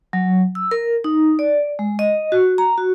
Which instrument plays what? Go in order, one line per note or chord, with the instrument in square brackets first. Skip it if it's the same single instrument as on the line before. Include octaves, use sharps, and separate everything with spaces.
[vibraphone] F#3
E6
A#4
D#4
D5
G#3
D#5
F#4
A#5
F#4